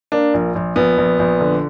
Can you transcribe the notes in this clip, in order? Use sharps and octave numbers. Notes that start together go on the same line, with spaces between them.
A#3 D4
A#1
A#1
A#1 B3
A#1
A#1
D3